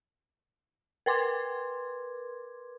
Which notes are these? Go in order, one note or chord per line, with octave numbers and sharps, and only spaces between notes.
A#4 B4 C6 D6 G#6